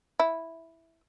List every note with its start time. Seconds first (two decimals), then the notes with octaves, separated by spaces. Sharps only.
0.20 E4